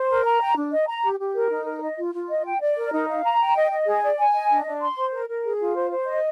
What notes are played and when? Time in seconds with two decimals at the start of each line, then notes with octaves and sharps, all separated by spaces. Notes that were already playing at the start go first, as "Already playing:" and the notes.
Already playing: C5
0.09 A#4
0.25 A#5
0.41 G5
0.56 D4
0.72 D#5
0.87 A#5
1.04 G4
1.19 G4
1.35 A#4
1.50 D#4
1.67 A#4
1.82 D#5
1.98 F4
2.13 F4
2.29 D#5
2.45 G5
2.61 D5
2.77 A#4
2.93 D#4
3.08 F5
3.24 A#5
3.40 G5
3.56 D#5
3.71 D#5
3.87 G#4
4.02 D5
4.18 G#5
4.34 D#5
4.51 D4
4.66 D4
4.81 C6
4.97 C5
5.13 A#4
5.29 A#4
5.45 G#4
5.60 F4
5.76 C5
5.92 C5
6.08 D#5